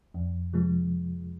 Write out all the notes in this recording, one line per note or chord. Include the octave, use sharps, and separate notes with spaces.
F2
C3 F3 G#3